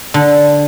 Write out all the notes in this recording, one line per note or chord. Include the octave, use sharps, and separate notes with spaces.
D3